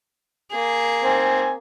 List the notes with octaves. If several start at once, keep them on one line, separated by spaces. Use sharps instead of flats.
A#3 G#4
C4 G#5